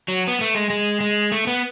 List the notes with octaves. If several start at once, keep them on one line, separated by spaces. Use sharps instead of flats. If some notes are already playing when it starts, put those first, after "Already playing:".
F#3
B3
A3
G#3
G#3
G#3
A3
B3